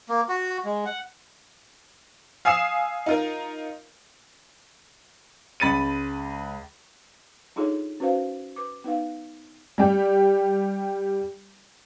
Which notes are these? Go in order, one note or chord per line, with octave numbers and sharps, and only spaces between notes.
A#3
F#4
G#3
F#5
F5 G#5 D#6 E6 C7 E7
D#4 F4 A#4
C#2 B5 A6 C#7 D#7
D4 D#4 F4 G#4 A4 C#5
C#4 F#4 B4 C5 F5
B4 D6
B3 D#4 B4 F5
G3 G4